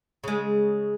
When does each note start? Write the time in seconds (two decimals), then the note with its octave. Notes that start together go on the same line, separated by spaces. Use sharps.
0.24 C#3 G#3